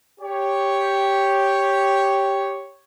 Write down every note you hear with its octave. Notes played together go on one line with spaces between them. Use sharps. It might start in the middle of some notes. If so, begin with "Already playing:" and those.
G4 C#5